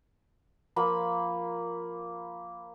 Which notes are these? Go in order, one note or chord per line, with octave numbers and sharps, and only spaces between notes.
F3 A#3 B5